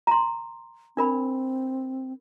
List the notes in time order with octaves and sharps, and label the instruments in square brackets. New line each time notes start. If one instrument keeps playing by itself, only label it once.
[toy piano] A#5 C6
[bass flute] C4 [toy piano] D4 A#4 B5